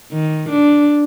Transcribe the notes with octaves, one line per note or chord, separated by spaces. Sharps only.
D#3
D4